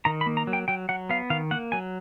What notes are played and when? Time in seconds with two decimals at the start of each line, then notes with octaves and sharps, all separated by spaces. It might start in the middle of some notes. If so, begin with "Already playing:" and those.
0.05 D#3 A#5
0.21 B5
0.26 A#3
0.37 A#5
0.47 F#3
0.53 G5
0.68 F#3 G5
0.89 F#3 F#5
1.09 B3 F5
1.30 D#3 F5
1.51 A#3 F#5
1.72 F#3 G#5